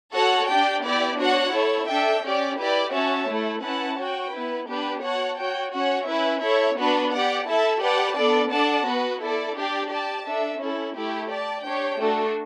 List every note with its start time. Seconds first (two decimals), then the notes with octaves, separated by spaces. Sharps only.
0.14 F#4 A4 C#5 F#5 A5
0.48 D4 G4 D5 G5
0.83 B3 E4 G4 D5
1.18 D4 F#4 C#5 F#5
1.53 E4 A4 C#5
1.88 D4 A4 E5 G5
2.23 C#4 G4 D5
2.58 E4 G4 B4 D5
2.92 C#4 F#4 C#5 E5 A5
3.28 A3 E4 A4
3.62 C#4 E4 B4 F#5 A5
3.97 F#4 C#5 G5
4.32 B3 E4 B4
4.66 B3 D4 G4 B4
5.01 F#4 C#5 F#5 A5
5.37 F#4 C#5 G5
5.72 C#4 F#4 C#5 F#5
6.06 C#4 E4 B4 E5
6.41 E4 A4 C#5 E5
6.76 B3 D4 F#4 B4
7.11 G4 D5 F#5
7.45 E4 A4 E5 A5
7.80 G4 B4 D5 F#5 A5
8.15 B3 D4 A4 D5
8.50 D4 A4 D5 F#5 A5
8.85 B3 F#4 B4
9.20 E4 A4 D5
9.55 D4 G4 D5
9.89 G4 D5 A5
10.24 D4 A4 E5
10.59 C#4 E4 A4
10.94 A3 E4 G4
11.29 G4 D5 A5
11.64 D4 G4 C#5 G5
11.98 A3 D4 F#4 A4